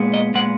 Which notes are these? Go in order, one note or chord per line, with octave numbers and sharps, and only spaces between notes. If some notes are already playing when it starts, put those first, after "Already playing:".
Already playing: A#2 G#3 B3
D#5
A#2 G#3 B3 F#5